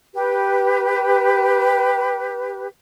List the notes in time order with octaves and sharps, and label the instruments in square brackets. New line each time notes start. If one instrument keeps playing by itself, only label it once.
[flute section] G4 B4